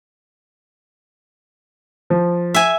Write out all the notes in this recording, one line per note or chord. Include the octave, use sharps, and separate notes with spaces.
F3
E5 G#5